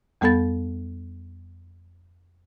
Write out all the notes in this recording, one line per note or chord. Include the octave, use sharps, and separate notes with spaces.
F2 G3 B3 A4 B5 A6